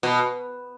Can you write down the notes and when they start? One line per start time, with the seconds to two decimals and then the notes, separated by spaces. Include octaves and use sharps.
0.03 B2